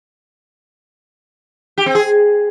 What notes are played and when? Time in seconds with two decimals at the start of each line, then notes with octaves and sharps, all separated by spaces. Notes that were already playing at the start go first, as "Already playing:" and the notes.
1.78 G4
1.86 C4
1.95 G#4